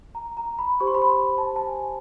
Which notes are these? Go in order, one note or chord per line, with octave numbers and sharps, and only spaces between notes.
A#5
A#5
B5
G4 C5 C#6
C6
B5
C6
B5
A5
A5
G#5